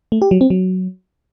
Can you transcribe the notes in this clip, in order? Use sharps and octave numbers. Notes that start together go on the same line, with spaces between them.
A3
G4
F#3
C4
F#3